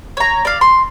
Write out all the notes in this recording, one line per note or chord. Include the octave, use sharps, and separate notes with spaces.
C#5 A#5
D5 F5
C6